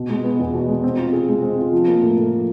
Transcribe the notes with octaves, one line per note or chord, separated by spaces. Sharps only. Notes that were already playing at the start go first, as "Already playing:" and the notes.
Already playing: B2
G#3
B3
E2
B2
G#3
C4
F4
G#4
G#3
C4
F4
F3
A#3
A2
A2
F3